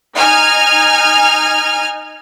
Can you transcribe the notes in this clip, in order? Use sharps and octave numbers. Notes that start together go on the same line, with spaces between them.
D#4 G#5 F6